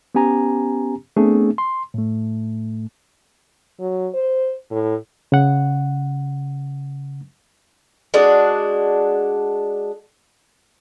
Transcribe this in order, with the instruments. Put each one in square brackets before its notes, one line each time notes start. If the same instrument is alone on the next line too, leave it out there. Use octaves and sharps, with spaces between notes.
[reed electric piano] B3 C#4 G4 G#5 A#5
A3 B3 C4 D4 G#4
C6
A2 A3
[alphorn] F#3
C5
A2
[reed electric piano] C#3 F#5
[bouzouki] G#3 D4 F#4